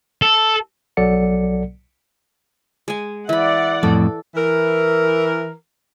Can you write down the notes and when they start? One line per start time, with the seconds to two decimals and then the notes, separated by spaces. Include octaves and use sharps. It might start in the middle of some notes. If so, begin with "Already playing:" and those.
0.22 A4
0.97 B1 F#3 A4 D5 F#5 C#7
2.88 G#3 G#5
3.29 E3 D5 E5 F#5 B5
3.83 F2 A2 A4
4.36 E3 A#4